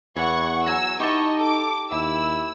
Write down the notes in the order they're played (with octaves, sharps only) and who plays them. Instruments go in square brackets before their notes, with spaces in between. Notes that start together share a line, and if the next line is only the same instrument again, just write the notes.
[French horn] E2 [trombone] E3 [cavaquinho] C#5 [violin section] F#5 C#6
[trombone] F#3 [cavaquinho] G#5 A#5 [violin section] E6
[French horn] D#4 [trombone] E4 [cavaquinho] G4 A5 [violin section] D#5 C#6
[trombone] A4 [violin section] D6
[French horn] D#2 [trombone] E4 [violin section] E6